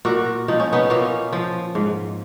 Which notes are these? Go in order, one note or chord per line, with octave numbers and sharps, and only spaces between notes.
A#2 F#4 A#4
F3 D#4
C#4
B3 D#4
A#2 A#3 C#4
F3
G#2